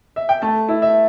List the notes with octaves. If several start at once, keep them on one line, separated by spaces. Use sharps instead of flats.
E5
G5
A3 A5
E4
E5